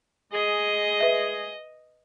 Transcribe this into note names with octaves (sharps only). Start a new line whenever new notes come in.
G#3 G#4 D#5
B4 E5